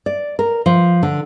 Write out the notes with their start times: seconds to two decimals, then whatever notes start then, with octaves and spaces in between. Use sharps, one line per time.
0.06 D5
0.39 A#4
0.66 F3
1.03 D3